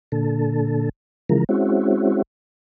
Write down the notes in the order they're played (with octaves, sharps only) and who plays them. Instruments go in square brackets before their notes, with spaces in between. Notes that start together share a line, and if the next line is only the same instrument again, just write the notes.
[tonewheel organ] A#2 D3 A4
C#3 E3 F3 G#3 A#4
G#3 C4 C#4 E4 F#4